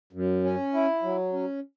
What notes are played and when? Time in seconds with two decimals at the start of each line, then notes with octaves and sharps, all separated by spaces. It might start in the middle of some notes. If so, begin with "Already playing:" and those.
0.13 F#2
0.44 C#4
0.74 E4
1.03 F#3
1.33 C#4